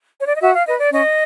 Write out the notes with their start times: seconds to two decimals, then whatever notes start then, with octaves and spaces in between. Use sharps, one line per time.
0.20 C#5
0.28 D5
0.35 D#5
0.41 F#4 E5
0.54 F5
0.66 B4 D#5
0.78 D5
0.90 C#4 D#5